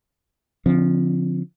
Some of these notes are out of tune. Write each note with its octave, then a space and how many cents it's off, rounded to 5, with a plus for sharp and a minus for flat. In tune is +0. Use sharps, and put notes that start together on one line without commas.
D3 -45 F3 +0 C4 +0